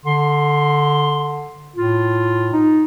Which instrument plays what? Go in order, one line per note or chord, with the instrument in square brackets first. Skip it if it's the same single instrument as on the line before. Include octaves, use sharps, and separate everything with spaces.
[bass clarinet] D3 [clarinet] C6
[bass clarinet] A2 [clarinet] F4
[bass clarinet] D#4